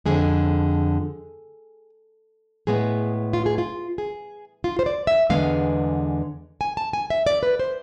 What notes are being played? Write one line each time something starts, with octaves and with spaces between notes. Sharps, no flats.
F2 D3 G#3 G#4
A2 G#3 B3 G#4
F4
G#4
F4
G#4
F4
C5
D5
E5
E2 D3 G#3 B3 F5
G#5
A5
G#5
E5
D5
B4
C5